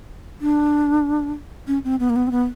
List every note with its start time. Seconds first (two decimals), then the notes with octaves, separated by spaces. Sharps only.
0.41 D4
1.67 C#4
1.85 C4
2.00 B3
2.10 A#3
2.16 B3
2.27 C4
2.31 B3